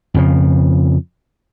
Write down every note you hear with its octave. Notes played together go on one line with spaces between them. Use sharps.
F2 C#3 F3